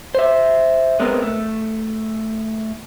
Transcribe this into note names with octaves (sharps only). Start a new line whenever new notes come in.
C5 E5
G#3 B3 C4 A#4
A3